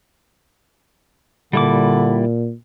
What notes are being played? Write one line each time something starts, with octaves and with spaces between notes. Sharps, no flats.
A#2 D3 G3 E4 D6